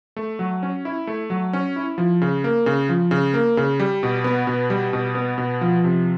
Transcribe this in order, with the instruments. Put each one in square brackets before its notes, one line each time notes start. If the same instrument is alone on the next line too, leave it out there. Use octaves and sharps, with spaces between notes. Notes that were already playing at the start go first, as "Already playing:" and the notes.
[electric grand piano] A3
F#3
C#4
E4
A3
F#3
C#4
E4
F3
C#3
A#3
C#3
F3
C#3
A#3
C#3
G3
B2
B3
B2
G3
B2
B3
B2
F3
C3